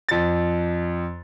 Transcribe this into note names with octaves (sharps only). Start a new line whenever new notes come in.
F2 A6